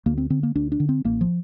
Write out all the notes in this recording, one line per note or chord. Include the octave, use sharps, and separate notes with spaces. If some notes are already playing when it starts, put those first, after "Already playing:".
D2 A#3
C4
D3 C4
A#3
D2 D4
D4
D3
C4
A1 A#3
F3